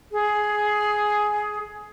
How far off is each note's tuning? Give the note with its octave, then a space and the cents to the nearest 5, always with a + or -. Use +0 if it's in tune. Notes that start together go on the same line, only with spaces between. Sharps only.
G#4 +10